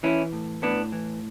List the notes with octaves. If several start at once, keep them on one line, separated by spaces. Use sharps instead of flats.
E3 C#4 E4
A2
A2 B3 D4
E3